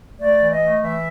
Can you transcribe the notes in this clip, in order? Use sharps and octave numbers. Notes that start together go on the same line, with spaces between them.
A3 D5
E3
D#5
A3
E3 E5